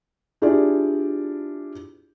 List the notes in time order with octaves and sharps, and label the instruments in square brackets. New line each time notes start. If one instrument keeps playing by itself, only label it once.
[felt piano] D4 E4 F4 G4 G#4 D5